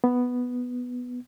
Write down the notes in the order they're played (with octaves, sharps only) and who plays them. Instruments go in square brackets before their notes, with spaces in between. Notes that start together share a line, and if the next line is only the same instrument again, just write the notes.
[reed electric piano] B3